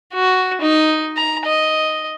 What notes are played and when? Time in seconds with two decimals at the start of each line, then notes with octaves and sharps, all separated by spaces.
0.14 F#4
0.61 D#4
1.17 A#5
1.45 D#5